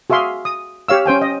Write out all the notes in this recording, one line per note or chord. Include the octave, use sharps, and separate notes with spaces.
F#4 G#4 E5 F5 C6
D#6
G4 C#5 F5 E6
C#4 C5 G5 G#5
D#5